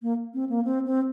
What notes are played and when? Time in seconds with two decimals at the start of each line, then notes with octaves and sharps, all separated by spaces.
0.02 A#3
0.34 C4
0.49 A#3
0.65 C4
0.86 C4